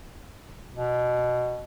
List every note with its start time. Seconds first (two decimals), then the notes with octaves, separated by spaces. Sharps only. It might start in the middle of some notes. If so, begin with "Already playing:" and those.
0.75 B2